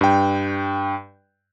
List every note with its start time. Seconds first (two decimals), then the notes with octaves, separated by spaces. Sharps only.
0.01 G2 G5